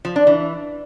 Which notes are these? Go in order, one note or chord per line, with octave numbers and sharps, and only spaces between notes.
F3
D4
E3